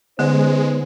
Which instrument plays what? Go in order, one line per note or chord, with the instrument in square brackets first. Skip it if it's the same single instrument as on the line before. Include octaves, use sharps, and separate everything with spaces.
[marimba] D3 [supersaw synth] G#3 [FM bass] B3 [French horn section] C#4 D#4 C5